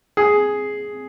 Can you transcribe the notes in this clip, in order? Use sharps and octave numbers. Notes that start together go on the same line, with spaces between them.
G#4